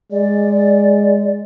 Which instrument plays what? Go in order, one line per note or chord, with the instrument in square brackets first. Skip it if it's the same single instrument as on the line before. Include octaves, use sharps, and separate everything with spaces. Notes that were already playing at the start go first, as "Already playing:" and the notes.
[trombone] G#3 [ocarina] D5